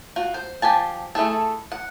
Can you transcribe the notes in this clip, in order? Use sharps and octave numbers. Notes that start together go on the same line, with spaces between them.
F4 F#4
C5
F3 G4 G#5 A5
A3 E4 G#4 A4
F#5